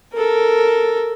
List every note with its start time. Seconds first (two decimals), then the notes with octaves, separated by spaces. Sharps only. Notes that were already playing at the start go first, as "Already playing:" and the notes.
0.14 A4 A#4